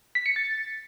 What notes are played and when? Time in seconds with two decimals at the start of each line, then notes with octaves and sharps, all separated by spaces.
0.15 B6
0.26 C#7
0.36 A6